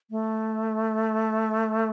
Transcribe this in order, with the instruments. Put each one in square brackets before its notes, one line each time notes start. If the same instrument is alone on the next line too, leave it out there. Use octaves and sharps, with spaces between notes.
[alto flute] A3